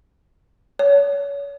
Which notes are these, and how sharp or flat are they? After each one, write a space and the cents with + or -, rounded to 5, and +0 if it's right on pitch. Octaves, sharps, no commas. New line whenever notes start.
C#5 +30